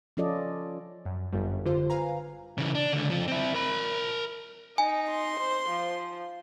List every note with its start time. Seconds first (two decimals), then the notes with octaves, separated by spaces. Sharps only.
0.17 F3 C#4 F4 A4 D5 D#5
1.05 F#2
1.33 G1 F#2 G3
1.65 G#1 D3 F4 C5
1.90 B4 F5 G#5 A#5
2.58 C#3 E3
2.75 D4
2.93 C#2 D3
3.10 F2 F3
3.28 C4 E4
3.54 A#4 B5
4.78 D#4 G#5
5.10 C6
5.40 C5
5.70 F3